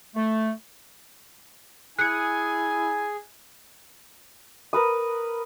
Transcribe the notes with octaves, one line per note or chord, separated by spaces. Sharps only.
A3
E4 G#4 G#5 F#6 C#7
A#4 B4 D#6